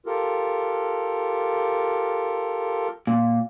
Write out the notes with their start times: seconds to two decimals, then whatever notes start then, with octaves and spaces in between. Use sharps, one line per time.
0.06 F4 G4 A4 A#4
3.07 A#2